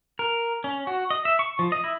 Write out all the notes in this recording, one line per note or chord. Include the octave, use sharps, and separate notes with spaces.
A#4
C#4
F#4
D#5
E5
C#6
F3
D#5
E4